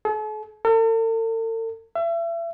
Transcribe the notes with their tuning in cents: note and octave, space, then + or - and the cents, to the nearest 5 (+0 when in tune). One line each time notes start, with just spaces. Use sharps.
A4 -45
A4 +45
E5 +35